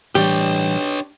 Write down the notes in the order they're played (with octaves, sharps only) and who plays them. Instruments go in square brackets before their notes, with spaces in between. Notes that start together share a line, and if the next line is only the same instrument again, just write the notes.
[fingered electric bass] A2 E3 G3 [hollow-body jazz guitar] D4 G4 [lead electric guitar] B4 C#5